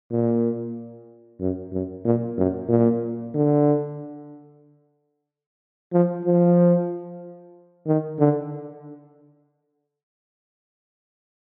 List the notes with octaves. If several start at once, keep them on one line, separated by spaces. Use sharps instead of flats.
A#2
F#2
F#2
A#2
F#2
A#2
D3
F3
F3
D#3
D3